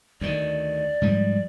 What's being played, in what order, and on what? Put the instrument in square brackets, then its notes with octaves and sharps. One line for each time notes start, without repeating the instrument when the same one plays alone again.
[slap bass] D2 D#3 [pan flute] D5
[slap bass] G#2 F3 G3